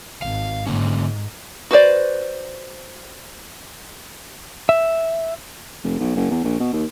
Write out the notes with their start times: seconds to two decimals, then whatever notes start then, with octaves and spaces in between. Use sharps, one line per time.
0.22 G#1 F5
0.67 G#2 D3 A#3 C#4
1.71 F#4 B4 C5 D5
4.69 E5
5.84 F1
6.00 B1
6.16 F#1
6.30 E2
6.44 A#1
6.60 B2
6.73 D#2